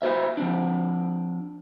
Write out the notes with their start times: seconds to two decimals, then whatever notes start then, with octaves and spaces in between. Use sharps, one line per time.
0.02 E4 F#4 C5 E5
0.37 F3 C4 D4